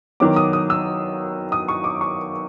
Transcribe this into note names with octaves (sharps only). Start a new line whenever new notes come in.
D#3 F#3 B3 D6
D#6
D#6
E6
D#6
C#6
D6
C#6